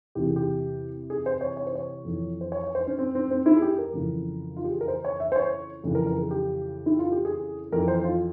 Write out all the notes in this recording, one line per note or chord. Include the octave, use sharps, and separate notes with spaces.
E2 C3 E3 G4
G#4
G4
G#4
C5
C#5
C#5
C5
C#5
F2 E3
C5
C#5
C#5
C5
C#4
C4
C4
C4
E4
G#4
G4
A#4
F2 C#3 E3
F4
G4
G#4
A#4
C5
C#5
E5
C5
C#5
F2 C#3 E3
A#4
A#4
G#4
G4
E4
F4
G4
G#4
F2 E3 A#4
C5
F4